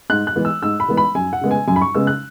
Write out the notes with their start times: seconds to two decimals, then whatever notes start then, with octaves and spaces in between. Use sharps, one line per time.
0.10 G#2 F#6
0.27 F#6
0.36 E3 G#3 B3
0.45 E6
0.62 G#2 E6
0.80 B5
0.88 E3 G#3 B3
0.97 B5
1.15 F#2 G#5
1.33 F#5
1.41 C#3 G#3 B3
1.51 G#5
1.68 F#2 G#5
1.76 B5
1.81 C#6
1.95 C#3 G#3 B3 E6
2.07 F#6